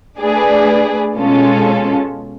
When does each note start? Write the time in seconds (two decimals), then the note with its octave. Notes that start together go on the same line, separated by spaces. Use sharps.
0.19 A3 D4 G#4 B4 D5
1.16 B2 G#3 C#4 F4 A4